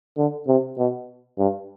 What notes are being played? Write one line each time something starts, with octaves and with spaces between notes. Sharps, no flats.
D3
C3
B2
G2